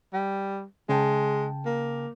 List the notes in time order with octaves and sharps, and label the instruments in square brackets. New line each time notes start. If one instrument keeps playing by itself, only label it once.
[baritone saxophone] G3
[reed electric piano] C#3 G5 A5 [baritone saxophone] G#3
[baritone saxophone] A#3